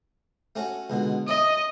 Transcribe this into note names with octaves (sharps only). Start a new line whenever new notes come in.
A3 C#4 F#4
C#2 B2 D3
E4 C#5 D#5